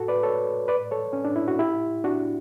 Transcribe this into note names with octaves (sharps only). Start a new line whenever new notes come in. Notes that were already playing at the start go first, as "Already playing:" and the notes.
Already playing: F#4 A4
B4 D5
A4 C#5
B4 D5
A4 C#5
C#4
D4
E4
F#4
E4 G4
D4 F#4